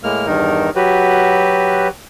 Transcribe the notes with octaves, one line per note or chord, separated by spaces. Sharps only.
A2 G#3 A#3 F6
E2 G2 D#3 D#4 A#4
F#3 F#4 G4 B4